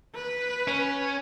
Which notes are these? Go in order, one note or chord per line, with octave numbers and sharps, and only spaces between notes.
B4
C#4